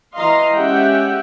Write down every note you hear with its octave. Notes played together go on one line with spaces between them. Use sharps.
E3 D#5 F5 A#5 C6
G#3 C#4 G4 E5 F#5 G5